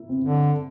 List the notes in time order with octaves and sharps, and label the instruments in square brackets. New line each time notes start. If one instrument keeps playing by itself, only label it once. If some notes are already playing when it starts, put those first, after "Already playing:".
Already playing: [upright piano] E4
C4
[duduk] D3